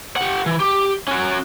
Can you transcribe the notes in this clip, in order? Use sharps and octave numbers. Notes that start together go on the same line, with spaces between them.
G4 F#5
E3
G4
C#4 F#4